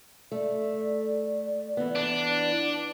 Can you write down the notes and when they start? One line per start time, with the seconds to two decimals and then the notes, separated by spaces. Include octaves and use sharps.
0.32 A3 D5
1.77 E3 B3
1.95 D4